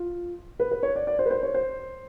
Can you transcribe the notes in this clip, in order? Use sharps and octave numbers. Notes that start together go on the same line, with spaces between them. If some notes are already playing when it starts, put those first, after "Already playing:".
Already playing: F4
B4
B4
C#5
D5
D5
C5
B4
C5
C#5
C5